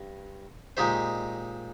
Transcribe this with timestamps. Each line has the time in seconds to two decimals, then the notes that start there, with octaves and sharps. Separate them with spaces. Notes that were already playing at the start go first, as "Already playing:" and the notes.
Already playing: G2
0.77 A#2 G#3 D#4 G4 C5